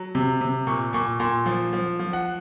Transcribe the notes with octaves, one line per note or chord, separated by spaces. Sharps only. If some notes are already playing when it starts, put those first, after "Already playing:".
Already playing: F#3
C3
C3
A#2 C#6
A#2 C#6
A#2 C6
F3
F3
F3
F#5